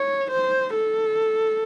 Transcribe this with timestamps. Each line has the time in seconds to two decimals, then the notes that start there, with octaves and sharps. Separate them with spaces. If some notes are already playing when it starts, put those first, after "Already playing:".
Already playing: C#5
0.32 C5
0.75 A4